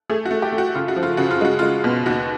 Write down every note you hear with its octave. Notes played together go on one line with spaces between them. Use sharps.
A3 G#4
F#4
A3
G4
A3
F#4
C#3 F4
F#4
F3
F4
C#3 F#4
F4
G#3 F#4
G#3 F4
B2
D#2 F#4